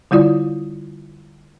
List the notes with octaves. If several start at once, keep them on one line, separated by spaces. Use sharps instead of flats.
D3 G3 E4 F4 D5